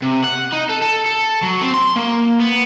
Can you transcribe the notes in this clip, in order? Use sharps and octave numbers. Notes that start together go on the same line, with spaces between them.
C3
F#5
D#4
A4
A4
A4
F#3
C4
C6
A#3
B3